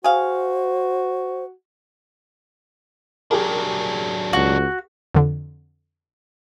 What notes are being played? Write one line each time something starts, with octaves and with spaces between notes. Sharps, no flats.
F#4 G#4 C5 F5
F#3 D4 G4 G#4 A#4
C#2 F#4
F2 D3